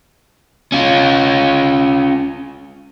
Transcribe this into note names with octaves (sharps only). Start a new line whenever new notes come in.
C#4 F4